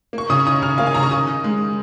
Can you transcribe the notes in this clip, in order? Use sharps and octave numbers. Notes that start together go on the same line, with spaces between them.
A#3
C#6
C#3 D#6
D#4 D#6
C#3 F6
A#3 F5
G#5
C#3 A#5
C#6
D#3 D#6
D#4
G#3